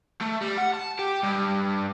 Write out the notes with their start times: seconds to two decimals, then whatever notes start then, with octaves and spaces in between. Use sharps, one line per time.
0.21 A3
0.41 G3
0.58 F#5
0.74 A5
0.99 G4
1.23 G2